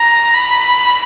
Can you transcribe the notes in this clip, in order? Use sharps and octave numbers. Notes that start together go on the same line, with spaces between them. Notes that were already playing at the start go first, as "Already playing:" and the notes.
Already playing: A#5
B5